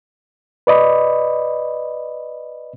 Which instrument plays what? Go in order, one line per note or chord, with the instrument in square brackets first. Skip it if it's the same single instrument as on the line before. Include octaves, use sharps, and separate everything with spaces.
[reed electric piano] B4 D5 D#5 B5